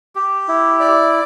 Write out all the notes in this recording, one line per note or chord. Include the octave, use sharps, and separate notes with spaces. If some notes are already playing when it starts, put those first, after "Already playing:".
G4
E4
D5